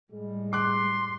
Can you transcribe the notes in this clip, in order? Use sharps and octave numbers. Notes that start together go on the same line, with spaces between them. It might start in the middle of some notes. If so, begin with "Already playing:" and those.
A2 G3 G#3
C6 D6 F#6